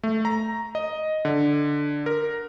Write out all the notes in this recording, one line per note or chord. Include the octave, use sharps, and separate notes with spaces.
A3
A#5
D#5
D3
A#4